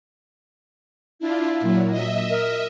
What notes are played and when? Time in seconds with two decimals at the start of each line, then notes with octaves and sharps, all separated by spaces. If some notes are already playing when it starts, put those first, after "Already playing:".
1.20 D4 E4 F4
1.61 A#2 F#3
1.90 D#5 E5
2.30 A#4